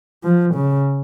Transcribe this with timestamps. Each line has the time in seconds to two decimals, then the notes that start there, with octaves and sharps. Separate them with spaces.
0.24 F3
0.55 C#3